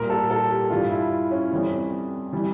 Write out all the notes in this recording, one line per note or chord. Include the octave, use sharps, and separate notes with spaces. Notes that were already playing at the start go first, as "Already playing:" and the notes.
Already playing: A#2 G3 A#4
A4
A4
G4
G2 E3 G3 F4
E4
C#4
F2 E3 G3
E3 G3